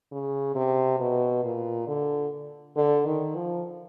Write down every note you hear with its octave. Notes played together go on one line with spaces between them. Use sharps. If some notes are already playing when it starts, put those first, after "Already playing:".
C#3
C3
B2
A#2
D3
D3
D#3
F3